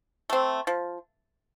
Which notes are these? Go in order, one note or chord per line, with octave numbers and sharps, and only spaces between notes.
A3 C4
F3